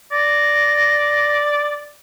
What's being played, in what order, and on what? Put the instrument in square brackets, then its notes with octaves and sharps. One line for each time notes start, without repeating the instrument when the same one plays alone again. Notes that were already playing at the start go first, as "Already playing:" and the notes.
[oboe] D5 [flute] A#6